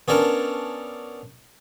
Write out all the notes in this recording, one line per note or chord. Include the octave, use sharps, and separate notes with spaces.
B3 C#4 D4 A4 A#4